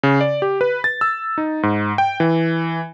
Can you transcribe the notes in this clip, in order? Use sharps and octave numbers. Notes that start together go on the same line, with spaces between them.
C#3
D5
G4
B4
A6
E6
D#4
G#2
G5
E3